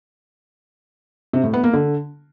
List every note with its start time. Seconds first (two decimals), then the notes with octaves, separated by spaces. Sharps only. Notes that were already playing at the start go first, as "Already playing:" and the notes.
1.33 C3
1.43 A2
1.53 B3
1.63 A#3
1.74 D3